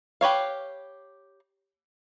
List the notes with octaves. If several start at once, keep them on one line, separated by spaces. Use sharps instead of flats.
G4 B4 C#5 F5